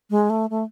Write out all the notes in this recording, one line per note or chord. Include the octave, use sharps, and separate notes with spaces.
G#3
A3
A3